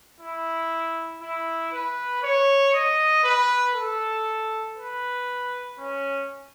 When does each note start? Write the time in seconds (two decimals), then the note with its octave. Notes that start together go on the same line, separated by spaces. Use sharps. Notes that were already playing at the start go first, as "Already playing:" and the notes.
0.20 E4
1.22 E4
1.72 B4
2.23 C#5
2.73 D#5
3.24 B4
3.75 A4
4.77 B4
5.78 C#4